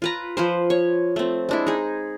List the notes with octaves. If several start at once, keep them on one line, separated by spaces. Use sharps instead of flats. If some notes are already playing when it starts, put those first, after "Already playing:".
F4 B4 A#5
F3 B4 C5
C#5
A3 C4
G#3 D4 E4
D#4 G#4